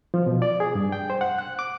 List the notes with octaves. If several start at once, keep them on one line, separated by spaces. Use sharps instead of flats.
F3
B2
D5
G#4
G2
G5
C5
F#5
F#6
D6